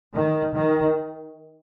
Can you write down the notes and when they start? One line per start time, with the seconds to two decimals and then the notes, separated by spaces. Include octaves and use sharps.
0.14 D#3
0.54 D#3